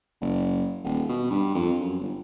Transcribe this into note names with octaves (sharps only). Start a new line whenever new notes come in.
F#1
D#1
B2
G2
F2
F#2
G1